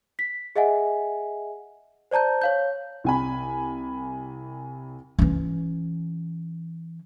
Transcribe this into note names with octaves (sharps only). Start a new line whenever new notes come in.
B6
G#4 D#5 E5 F#5 G#5
C5 D5 A5 A#5 G6
C#5 F5 G6
C2 G#5 B5
E3 C#4